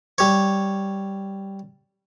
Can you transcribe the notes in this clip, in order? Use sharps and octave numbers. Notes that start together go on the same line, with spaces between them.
G3 C#5